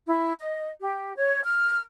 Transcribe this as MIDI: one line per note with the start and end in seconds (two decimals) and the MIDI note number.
0.07 0.32 64
0.39 0.67 75
0.80 1.14 67
1.15 1.43 73
1.44 1.80 89